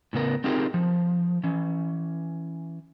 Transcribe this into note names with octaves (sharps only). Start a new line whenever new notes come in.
A2 C#3 B3 A#4
C4 D#4 F4 G4 G#4 A#4
F3
E3 C#4